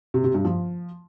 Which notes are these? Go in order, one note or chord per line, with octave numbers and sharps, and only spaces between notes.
C3
C3
G2
F3